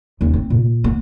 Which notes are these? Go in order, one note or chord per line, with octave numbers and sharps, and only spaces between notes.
D#2 C#4
C4
A#2
B3